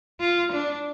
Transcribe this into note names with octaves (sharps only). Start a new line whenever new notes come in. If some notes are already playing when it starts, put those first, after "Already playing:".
F4
D4